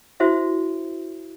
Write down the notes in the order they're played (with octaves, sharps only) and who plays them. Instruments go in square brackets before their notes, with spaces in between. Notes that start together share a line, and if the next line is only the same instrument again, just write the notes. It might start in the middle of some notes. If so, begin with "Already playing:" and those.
[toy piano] E4 F#4 C5 E5